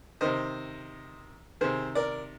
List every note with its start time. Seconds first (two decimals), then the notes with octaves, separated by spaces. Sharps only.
0.21 C3 D#3 C5 D#5
1.61 C3 D#3 G#4 C5
1.95 A#4 D5